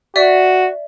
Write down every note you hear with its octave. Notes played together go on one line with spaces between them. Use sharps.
F#4 D5 E5